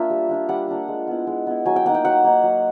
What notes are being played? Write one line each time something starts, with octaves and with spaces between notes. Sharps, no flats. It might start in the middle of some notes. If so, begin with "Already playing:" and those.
Already playing: A#3 D4 F4 E5
G3
A#3 D4 F4
G3 F#5
A#3 D4 F4
G#3
B3 E4
G#3
B3 E4
F#3 G#5
G5
A#3 D#4 F#5
G5
F#3 F#5
A#3 D#4
F#3